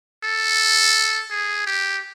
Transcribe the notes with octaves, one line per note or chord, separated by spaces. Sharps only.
A4
G#4
G4